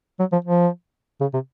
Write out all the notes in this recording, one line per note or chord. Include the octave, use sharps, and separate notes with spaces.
F#3
F3
F3
C#3
C3